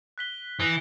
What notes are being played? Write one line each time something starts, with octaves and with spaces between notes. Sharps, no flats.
F#6 B6 G7
E3 D#6 A#6